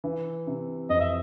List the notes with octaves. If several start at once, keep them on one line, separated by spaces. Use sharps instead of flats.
E3
C3
F2 D#5
E5